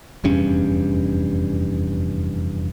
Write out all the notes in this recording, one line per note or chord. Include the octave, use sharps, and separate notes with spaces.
F1 E2 G2 C#4